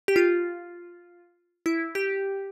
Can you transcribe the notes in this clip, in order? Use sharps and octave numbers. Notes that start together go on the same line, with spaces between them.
G4
F4
E4
G4